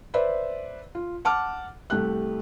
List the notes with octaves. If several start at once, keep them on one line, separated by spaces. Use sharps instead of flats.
B4 C5 D5 E5
F4
F#5 A5 D6 F6
C2 A3 G4 F#6